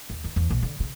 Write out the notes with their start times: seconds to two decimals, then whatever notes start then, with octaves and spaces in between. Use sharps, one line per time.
0.10 D#2
0.24 D#3
0.36 E2
0.50 A#1
0.62 D3
0.80 C#3